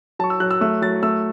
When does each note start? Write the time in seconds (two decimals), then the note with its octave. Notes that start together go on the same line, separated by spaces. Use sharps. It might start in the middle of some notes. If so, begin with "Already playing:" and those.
0.19 F#3 A5 C#6
0.30 E6
0.40 F#3 F#6
0.51 E6
0.61 A3 E6
0.82 F#3 A6
1.02 A3 E6